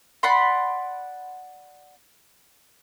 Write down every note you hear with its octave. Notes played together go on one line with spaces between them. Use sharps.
D5 F#5 B5 C6